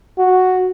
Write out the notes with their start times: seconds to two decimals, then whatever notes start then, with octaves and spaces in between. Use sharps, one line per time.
0.19 F#4